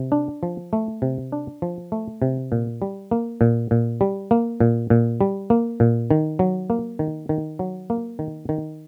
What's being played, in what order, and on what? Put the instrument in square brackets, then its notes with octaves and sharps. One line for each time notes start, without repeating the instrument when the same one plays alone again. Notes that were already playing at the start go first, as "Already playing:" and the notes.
Already playing: [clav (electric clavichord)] C3
D4
F3
A3
C3
D4
F3
A3
C3
A#2
G3
A#3
A#2
A#2
G3
A#3
A#2
A#2
G3
A#3
A#2
D#3
F#3
A#3
D#3
D#3
F#3
A#3
D#3
D#3